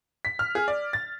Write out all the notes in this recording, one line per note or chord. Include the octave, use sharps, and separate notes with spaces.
B6
F6
G#4
D5
A6